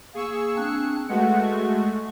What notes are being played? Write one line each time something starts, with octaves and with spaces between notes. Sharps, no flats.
A#3 G#4 C#6 E6
C4 D4 F#6
G#3 A3 F#4 B4 F#5
C#6